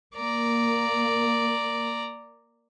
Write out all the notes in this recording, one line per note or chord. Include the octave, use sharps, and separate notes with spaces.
A#3 D5 A#5